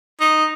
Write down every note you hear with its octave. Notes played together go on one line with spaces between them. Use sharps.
D#4